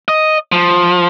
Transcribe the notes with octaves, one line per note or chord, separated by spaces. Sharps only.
D#5
F3